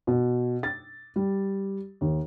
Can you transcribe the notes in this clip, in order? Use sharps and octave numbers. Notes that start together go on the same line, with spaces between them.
B2
A6
G3
D#2